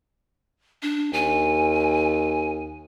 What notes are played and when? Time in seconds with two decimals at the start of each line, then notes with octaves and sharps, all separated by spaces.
0.83 D4
1.13 D#2 G#5